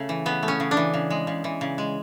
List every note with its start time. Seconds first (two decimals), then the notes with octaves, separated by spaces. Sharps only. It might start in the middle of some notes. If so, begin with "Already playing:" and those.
Already playing: C#3 A3
0.09 E3
0.26 C#3 B3
0.43 A3
0.48 C#4
0.60 C#3
0.71 D4
0.77 E3
0.94 C#3
1.10 G#3
1.27 C#3
1.44 E3
1.61 C#3
1.78 G#3